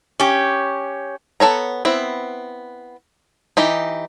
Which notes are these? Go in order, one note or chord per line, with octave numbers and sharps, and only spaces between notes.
C#4 G4
B3 A4 C#5 A#5
B3 C4 E4
E3 D#4 G4